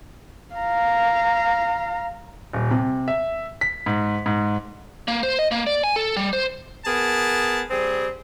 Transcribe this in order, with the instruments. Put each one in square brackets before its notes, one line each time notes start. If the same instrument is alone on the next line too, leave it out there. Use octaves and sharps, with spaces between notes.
[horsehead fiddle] F5 A#5
[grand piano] D#1
C3
E5
B6
G#2
G#2
[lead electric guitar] A#3
C5
D#5
A#3
D5
G#5
A4
G3
C5
[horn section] B3 G#4 A#4 A5
G3 C4 G#4